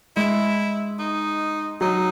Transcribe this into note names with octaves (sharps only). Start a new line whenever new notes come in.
G#3 E4
D#4
F#3 D#4